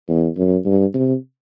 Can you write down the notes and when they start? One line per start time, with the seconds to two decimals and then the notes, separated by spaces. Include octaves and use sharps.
0.08 E2
0.37 F#2
0.65 G2
0.94 C3